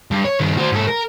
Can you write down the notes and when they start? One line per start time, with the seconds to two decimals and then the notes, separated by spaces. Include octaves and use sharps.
0.11 G2
0.25 C#5
0.40 G2 D#3
0.57 F#4 C5
0.72 G#2 A4
0.88 A#4